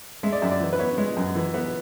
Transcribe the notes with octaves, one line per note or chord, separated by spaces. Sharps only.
G#3 E5
D5
F#2 E5
D5
E3
B4
B3 C#5
G#3
F#2
E3
B3